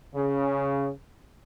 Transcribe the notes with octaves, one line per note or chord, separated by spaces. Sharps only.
C#3